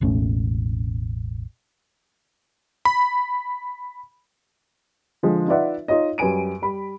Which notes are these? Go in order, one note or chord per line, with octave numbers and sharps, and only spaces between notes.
E1 A1 A3 C#4
B5
D3 F3 G#3
D#4 F4 B4 D5 E5 F#5
D#4 F4 C#5 D#5
F#2 G3 B4 G#5 D7 D#7
G3 B5